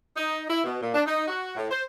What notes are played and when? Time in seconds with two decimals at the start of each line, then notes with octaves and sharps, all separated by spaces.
0.17 D#4
0.49 E4
0.64 B2
0.81 A#2
0.94 D4
1.06 D#4
1.28 F#4
1.57 A2
1.71 C5